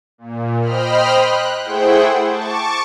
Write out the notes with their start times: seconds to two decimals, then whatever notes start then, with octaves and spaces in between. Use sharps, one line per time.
0.18 A#2
0.60 C5 D#5 G5 B5 F6
1.13 F#6
1.62 A3 E4 G#4 C5 F#5 G5
2.26 A5 C#6 D6